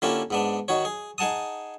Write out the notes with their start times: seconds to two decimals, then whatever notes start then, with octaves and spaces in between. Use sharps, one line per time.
0.02 D3 A#3 C#4 E4 F4 G4
0.30 G#2 B3 D4
0.68 D#3 D#4 F#4 C#5
0.85 G#4
1.18 D#4 G#4 F#5 A5 D#6